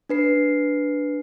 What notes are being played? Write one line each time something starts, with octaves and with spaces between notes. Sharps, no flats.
D4 B4 C7